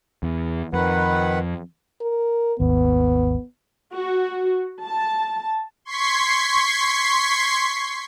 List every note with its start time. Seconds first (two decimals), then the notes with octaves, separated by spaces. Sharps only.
0.23 E2
0.73 F2 D#3 B4 F#5
2.01 A#4
2.60 G#1 D#2 B3
3.94 F#4
4.85 A5
5.85 C6 C#6 G#6 B6 C7